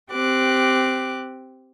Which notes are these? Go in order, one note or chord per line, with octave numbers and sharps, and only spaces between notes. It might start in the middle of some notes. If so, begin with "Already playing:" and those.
C4 G4 D6 F#6